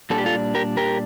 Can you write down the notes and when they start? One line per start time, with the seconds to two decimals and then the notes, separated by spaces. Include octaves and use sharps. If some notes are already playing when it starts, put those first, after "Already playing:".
0.10 A#2 G3 D4 A4
0.18 G4
0.26 F4 A4
0.55 G4 A#4
0.77 G4 A#4